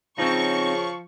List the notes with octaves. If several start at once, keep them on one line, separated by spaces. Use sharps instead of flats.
C#3 F3 C4 D#4 C#6